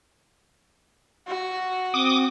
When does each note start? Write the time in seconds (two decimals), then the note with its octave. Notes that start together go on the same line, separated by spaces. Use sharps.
1.27 F#4
1.94 C4 D6 D#6